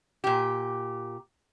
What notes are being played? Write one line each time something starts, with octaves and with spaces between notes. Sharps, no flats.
A#2 G4